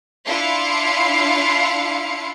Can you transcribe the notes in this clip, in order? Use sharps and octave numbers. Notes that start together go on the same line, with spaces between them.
D4 E4 F4 F5 C#7